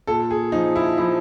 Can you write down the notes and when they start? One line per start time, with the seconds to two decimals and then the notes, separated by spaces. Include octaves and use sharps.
0.07 A#2 A4
0.31 G#4
0.52 F3 D#4
0.76 E4
0.98 F3 E4